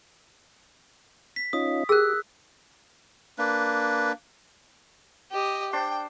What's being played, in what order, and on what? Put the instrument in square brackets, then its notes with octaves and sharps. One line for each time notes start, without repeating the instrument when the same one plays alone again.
[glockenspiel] B6
[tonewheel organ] C#4 D#4 F4 [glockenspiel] D#6
[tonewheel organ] G4 [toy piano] G#4 A#4 [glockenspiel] E6 F#6
[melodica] A#3 D4 B4
[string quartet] G4 D#5
[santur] D4 C5 [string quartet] G5